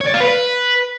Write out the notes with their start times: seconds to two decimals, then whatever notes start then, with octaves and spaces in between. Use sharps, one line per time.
0.01 C#5
0.07 D5
0.14 F4
0.20 B4